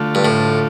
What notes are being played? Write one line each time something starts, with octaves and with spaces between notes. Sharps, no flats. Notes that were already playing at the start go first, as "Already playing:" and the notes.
Already playing: D3 A3 F4
G2
A2